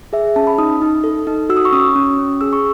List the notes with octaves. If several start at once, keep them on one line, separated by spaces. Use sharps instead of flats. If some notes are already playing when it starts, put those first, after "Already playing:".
G#4 E5
C#4 A5
B5
D#4 D#6
D#4
A4
D#4
F#4 E6
D#6
C#6
C#4 D#6
C#4
C#4
G#4 E6
C#6